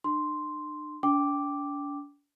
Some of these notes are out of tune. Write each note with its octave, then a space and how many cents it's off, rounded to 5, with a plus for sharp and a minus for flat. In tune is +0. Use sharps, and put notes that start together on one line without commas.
D4 +45 C6 +0
D4 -40 G5 +0 D6 +0